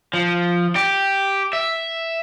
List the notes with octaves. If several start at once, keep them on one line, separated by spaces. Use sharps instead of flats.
F3
G4
E5